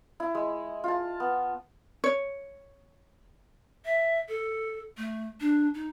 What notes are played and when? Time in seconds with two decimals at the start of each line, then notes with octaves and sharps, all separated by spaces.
0.20 E4
0.35 G#3
0.84 F4 A5
1.20 B3
2.04 C#5
3.85 E5
4.28 A4
4.97 A3
5.40 D4
5.74 D#4